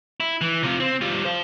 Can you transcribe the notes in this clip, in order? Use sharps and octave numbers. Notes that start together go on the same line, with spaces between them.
E4
E3
C3 F4
C4
G3 F4
C5 F5